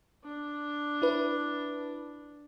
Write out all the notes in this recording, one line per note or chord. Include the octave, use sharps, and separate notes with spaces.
D4
E4 B4